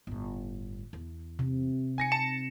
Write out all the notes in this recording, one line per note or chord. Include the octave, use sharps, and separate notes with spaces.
G1 A2
E2
C3
D#4 G#5 A#6 C#7
A5 C#7 E7